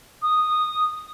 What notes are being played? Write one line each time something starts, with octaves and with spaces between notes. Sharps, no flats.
D#6